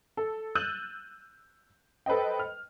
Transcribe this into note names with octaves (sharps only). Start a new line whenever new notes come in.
A4
E6 F#6 G6 A6 D#7
A4 B4 C5 D#5 G5
F6